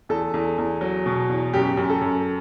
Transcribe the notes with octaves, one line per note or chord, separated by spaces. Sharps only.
E2 A4
E2
E2
F#3
B2
E2
F#2 G4
F#2
A4
F#2